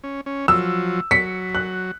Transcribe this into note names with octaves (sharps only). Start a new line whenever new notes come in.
C#4
C#4
F3 F#3 E6
F#3 B6 C#7
F#6